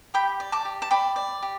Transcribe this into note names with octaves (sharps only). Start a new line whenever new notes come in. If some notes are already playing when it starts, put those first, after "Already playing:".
G4 G5 B5
D5
A5 D6
G4
A5
D5 G5 B5
D5
G4